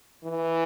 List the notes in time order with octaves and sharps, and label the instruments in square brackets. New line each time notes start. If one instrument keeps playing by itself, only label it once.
[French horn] E3